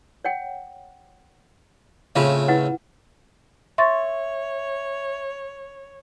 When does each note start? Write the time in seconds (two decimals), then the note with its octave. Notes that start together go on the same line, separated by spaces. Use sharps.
0.24 C#5 F#5 G5
2.16 A2 C#3 C4 F4 F5
2.48 E4 B4 F#5
3.78 C#5 E5 C6 C#6 A6